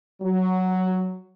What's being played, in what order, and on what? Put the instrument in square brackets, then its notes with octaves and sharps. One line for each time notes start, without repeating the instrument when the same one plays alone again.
[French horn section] F#3